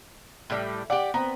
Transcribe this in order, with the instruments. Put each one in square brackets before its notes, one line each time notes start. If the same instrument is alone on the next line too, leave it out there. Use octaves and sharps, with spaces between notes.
[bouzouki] A2 G3
[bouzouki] G4 D5 [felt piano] F#5
[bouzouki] B3 [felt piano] C4 A#5